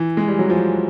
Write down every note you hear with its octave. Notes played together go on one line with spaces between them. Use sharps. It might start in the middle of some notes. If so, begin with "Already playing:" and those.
Already playing: E3
G#3
G3
F#3
F3